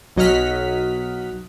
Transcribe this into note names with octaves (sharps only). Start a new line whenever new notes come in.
B1 F#3 D#5 F#5 F6 B6